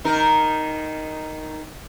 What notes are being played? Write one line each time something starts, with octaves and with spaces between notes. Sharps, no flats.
D#3 D#4 A#4